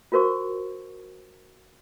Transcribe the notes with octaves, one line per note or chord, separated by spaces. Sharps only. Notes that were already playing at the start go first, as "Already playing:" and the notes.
F4 F#4 A#4 C5 C#6